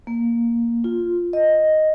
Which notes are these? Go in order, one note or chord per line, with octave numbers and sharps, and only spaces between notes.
A#3
F4
D#5